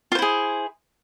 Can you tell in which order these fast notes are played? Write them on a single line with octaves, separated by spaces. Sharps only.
F4 C5 E4 G#4